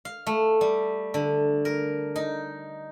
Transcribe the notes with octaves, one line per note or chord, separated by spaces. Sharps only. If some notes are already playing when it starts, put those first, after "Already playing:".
F5
A3
G3
D3
A#4
D#4